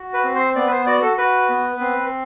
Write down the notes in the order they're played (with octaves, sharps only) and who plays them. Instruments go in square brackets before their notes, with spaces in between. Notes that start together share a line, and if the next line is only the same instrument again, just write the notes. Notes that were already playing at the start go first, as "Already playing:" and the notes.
Already playing: [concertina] F#4
B4
C4
C5
B3 D5
B4
C5
F#4 D5
A4
F#4 B4
B3
C4